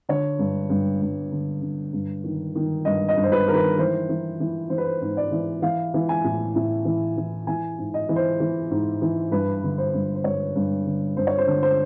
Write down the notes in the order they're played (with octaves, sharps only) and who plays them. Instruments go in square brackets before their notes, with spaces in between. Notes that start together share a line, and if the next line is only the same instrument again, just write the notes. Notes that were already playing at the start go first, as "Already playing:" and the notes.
[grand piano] D3 C#5
G2
G2
G2
D3
D3
G2
D#3
D#3
G2 D#5
D#5
G2
C5
B4
D#3 A#4
B4
E3 C5
E3
E3
E3 C5
B4
C5
G#2
D5
E3
E3 F5
E3
G#5
A2
A2
E3
E3
E3 G#5
G#2
D#5
E3
C5
E3
G#2
E3
G2 B4
D3
C5
G2
C5
G2 C#5
G2
D3
G2 C5
C#5
C5
D3
C5